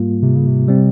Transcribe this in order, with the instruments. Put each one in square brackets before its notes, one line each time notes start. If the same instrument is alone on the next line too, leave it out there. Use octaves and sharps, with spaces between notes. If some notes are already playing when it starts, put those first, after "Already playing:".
Already playing: [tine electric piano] G#2 G3 A#3 F4
[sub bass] C3
C#3
C3
[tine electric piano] G3 C4